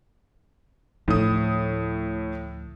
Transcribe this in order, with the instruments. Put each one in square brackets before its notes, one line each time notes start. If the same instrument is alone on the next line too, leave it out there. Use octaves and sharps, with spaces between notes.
[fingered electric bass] D2 F3 A3 [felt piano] A2 D#6